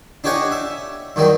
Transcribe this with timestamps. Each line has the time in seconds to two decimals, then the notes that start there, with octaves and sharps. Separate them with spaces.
0.24 D4 D#4 G4 C#5 F#5 G#5
0.52 E5
1.16 G2 D#3 F#3 G3